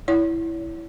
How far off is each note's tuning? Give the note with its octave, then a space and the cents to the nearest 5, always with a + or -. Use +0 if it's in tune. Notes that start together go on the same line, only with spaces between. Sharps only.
E4 +0 C#5 +40